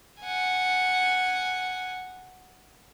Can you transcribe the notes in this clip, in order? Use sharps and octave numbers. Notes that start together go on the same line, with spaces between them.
F#5 G#5